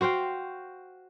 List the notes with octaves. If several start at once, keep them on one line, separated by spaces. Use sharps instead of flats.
F#4 C5 F5 G5